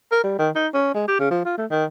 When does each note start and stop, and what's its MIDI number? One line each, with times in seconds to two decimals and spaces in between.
0.12 0.23 70
0.24 0.34 55
0.39 0.50 51
0.55 0.68 63
0.74 0.92 61
0.94 1.05 56
1.08 1.16 67
1.19 1.29 49
1.31 1.44 53
1.45 1.53 65
1.58 1.66 57
1.71 1.85 51